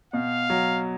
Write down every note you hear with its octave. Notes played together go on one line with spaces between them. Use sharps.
B2 F5
F#3